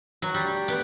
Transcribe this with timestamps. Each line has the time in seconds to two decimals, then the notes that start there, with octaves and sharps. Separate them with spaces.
0.22 F#3
0.33 G3 A3 D4 G4
0.68 B3